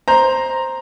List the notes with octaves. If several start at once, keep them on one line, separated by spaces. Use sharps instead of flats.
C5 A#5